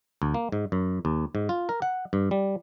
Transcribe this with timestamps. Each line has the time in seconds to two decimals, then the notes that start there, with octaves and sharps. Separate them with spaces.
0.22 D2
0.34 A#3
0.52 G#2
0.72 F#2
1.05 D#2
1.35 G#2
1.49 F4
1.69 A#4
1.82 F#5
2.13 G2
2.31 G3